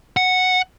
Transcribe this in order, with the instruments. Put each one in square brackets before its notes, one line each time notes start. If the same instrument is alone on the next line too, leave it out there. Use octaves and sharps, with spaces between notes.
[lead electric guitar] F#5